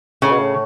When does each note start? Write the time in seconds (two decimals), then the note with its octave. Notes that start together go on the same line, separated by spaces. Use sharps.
0.22 A2 C#3
0.30 B2
0.38 A2